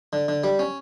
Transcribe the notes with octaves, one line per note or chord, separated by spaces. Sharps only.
D3
D3
G3
C#4